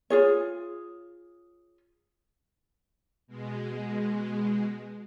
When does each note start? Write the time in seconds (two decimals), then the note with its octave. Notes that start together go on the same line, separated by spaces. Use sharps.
0.10 F4 G#4 C#5
3.27 B2 G#3